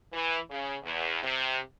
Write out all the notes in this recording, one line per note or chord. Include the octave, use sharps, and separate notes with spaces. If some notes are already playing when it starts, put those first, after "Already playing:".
E3
C#3
E2
C3